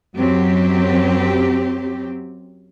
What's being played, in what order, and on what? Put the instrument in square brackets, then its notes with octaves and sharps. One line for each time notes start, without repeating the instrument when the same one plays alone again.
[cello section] F#2 F#3 C4 G4